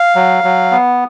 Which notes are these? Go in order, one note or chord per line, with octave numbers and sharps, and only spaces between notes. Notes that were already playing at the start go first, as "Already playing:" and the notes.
Already playing: F5
F#3
F#3
B3